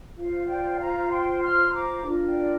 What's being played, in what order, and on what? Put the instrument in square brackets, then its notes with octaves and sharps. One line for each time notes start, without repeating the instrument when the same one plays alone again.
[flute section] F4 C5 F5
D5 G5
F5 A#5
G5 C6
C6 F6
A#5 D6
D4 F4 A#4
D5 G5